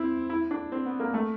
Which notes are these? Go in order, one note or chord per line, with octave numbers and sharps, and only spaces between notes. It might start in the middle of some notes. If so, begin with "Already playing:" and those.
Already playing: C4 E4
E4
D4
C4
B3
A#3
A3